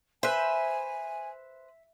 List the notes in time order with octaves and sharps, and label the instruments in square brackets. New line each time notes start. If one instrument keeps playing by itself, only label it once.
[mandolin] B4 C5 [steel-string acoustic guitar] E5 [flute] G#5